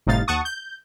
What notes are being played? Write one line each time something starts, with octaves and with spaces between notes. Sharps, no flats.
G1 A2 C3 D#4 F5 A6
D#2 F#5 A5 C#6 D#6
G6